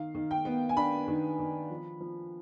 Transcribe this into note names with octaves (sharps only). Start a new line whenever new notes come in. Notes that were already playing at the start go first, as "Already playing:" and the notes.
Already playing: D#3 F5
D#3
G5
B3
G#5
D4 B5
D#3
D#3
F3
F3